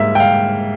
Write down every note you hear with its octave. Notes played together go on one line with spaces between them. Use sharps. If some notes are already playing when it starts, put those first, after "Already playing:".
Already playing: G#2 G3 A#3 E5
G5
F5